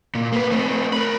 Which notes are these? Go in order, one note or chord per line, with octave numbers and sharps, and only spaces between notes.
A#2
A#3 B4
A3 C4
A#4 B5